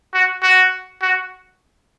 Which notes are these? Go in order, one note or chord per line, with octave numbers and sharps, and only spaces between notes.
F#4
F#4
F#4